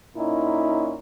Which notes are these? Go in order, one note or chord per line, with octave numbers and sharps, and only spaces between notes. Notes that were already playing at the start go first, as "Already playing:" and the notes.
A#2 C#4 D#4 E4